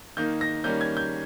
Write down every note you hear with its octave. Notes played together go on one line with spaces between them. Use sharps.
D#3 A#3 D#4 G6
A#6
D#3 G3 A#3 C#4 G6
G#6
G6